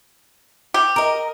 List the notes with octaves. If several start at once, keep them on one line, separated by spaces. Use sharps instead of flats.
G4
A#4 D#5